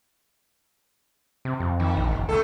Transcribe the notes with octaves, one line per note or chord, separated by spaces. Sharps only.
C3
F2
F2 D#3
A#1
F#1
C#2 A3 A4